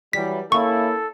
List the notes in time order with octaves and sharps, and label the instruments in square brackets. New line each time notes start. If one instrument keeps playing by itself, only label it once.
[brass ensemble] E3 F#3 G3 [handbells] B6
[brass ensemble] A#3 C#4 E4 [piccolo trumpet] A4 [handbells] C#6